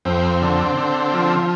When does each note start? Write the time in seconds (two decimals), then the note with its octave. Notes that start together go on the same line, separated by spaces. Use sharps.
0.05 F2 C4
0.42 D3
0.77 D3
1.13 F3